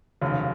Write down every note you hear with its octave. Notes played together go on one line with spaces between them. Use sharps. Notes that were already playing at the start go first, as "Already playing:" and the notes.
F1 D#2 C#3 F#3